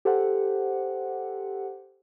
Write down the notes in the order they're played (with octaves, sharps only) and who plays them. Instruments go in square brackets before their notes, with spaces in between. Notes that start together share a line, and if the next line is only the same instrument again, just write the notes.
[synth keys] G4 A4 C5 F#5